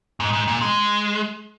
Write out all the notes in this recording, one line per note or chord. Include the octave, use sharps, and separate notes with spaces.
G#2
G#2
A#2
G#3